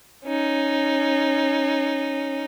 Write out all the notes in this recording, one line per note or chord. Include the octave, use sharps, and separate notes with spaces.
C#4 D#4